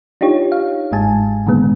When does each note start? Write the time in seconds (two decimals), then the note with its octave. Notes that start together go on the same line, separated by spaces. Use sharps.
0.21 D4 D#4 F4 G4 C#5
0.52 F5
0.92 G1 G#2 G#3 G#5 A5
1.46 A#2 D3 D#3 G#3 B3